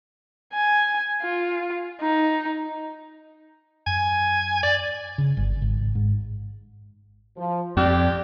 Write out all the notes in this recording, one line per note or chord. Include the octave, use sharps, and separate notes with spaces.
G#5
F4
D#4
F#2 G#5
D5
C#3
G1
G#1
G#2
F3
F2 G4 D5